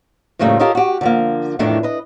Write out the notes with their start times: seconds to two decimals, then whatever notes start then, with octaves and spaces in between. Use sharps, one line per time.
0.39 F2 A2 C#3 G3 A3 A#3
0.60 F4 G4 A4 A#4 C#5 D#5
0.75 F#4 G4
1.01 D3 F3 A#3
1.59 F2 A2 D#3 E3 A3 D4
1.83 B4 D#5